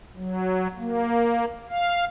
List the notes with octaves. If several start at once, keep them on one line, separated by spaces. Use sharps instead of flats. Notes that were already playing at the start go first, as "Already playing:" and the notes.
F#3
A#3
F5